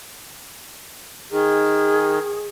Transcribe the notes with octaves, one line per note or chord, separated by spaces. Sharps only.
D#3 G#4